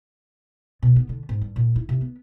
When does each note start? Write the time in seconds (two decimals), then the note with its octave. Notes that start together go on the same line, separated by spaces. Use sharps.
0.83 B2
0.96 B3
1.09 D3
1.29 G#2
1.41 G2
1.56 A#2
1.76 E4
1.89 C3
2.01 B3